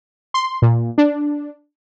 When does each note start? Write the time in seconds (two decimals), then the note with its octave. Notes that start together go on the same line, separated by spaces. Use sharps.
0.34 C6
0.62 A#2
0.98 D4